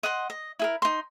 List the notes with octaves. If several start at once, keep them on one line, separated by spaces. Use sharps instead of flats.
D#5 F#5 C6
D#5
E4 G#4 A#4
D#4 C6